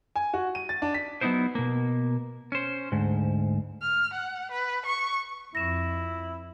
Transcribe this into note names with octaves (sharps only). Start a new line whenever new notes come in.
G#5
F#4
D#7
A6
D4
B6
F#3 B3 C4 D#4 E4 C5
B2 A#3
C#4 C5
D2 G#2
F6
F#5
B4
C#6
F2 E4 A#6 E7